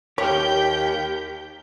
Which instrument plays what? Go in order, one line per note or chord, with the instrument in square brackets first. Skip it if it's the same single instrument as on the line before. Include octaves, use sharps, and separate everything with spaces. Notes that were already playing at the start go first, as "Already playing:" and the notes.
[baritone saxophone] D#2 [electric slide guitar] G4 [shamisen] C#5 [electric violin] G5 G6